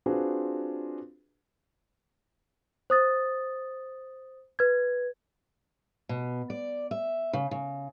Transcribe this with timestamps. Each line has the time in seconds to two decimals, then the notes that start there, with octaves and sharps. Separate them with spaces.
0.06 C4 D4 F4 F#4 G#4 B4
2.90 C5 D#6 A6
4.59 B4 G#6
6.09 B2
6.50 D5
6.91 E5
7.33 C#3
7.51 C#3